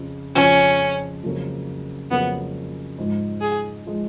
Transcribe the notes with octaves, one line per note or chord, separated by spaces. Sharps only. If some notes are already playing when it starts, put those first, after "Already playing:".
Already playing: F2 C#3 F3
F2 C#3 F3 C#4
F2 C#3 F#3 A#3 C#4
F2 C#3 F#3 A#3 B3 C#4
G#2 F3 G#3
G#4
F3 G#3